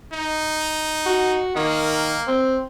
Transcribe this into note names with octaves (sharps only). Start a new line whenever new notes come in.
D#4
F#4
D#3 A#3
C4